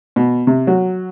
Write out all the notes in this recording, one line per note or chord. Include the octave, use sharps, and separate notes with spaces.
B2
C3
F#3